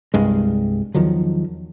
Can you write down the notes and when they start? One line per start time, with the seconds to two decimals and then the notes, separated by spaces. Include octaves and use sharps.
0.14 C2 G2 G#3
0.94 E2 D#3 F3 F#3